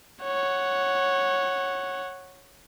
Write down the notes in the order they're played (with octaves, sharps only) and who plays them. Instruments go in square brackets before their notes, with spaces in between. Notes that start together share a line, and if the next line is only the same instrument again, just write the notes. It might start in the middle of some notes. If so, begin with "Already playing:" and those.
[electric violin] C#5 F#5